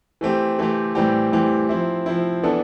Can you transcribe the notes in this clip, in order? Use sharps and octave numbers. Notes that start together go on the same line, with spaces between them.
E3 A3 C4 G4
E3 A3 C4 G4
A2 E3 G3 C4 G4
A2 E3 G3 C4 G4
F3 C4 E4
F3 C4 E4
E3 B3 D4 A4